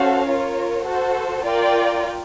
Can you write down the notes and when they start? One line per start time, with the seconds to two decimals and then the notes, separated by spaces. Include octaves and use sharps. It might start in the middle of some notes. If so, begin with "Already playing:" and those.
Already playing: C#4 F#4 A4 C5 F5
0.26 F4 A#4 C#5
0.85 F#4 A4 C5
1.45 F4 A#4 D5 G5